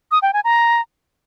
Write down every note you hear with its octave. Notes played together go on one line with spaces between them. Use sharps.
D#6
G5
G#5
A#5